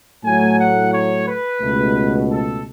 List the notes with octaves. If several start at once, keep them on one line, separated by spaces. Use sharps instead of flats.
A2 F#3 A3 G#5
F#5
C#5
B4
C#2 B2 A3
A4